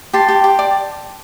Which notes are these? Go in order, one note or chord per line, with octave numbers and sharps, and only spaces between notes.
G4 A5 C6
G4
G4
D5